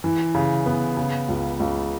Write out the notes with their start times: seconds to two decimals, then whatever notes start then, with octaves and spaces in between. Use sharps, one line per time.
0.04 E3
0.35 C#3
0.66 B3
0.97 C#3
1.28 C#2
1.60 C#2